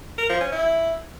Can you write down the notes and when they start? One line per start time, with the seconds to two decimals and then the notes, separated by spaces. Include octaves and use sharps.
0.18 A#4
0.29 F3
0.41 C#4
0.52 E4